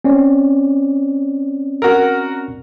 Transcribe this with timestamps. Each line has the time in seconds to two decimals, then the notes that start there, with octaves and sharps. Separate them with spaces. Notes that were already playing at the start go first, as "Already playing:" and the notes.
0.04 C4 C#4 D5
1.82 F#4 A#4